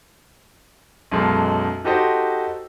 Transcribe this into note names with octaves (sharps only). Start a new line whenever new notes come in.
B1 F#2 G#3 A4
D#4 F#4 G4 A4 C5 D#5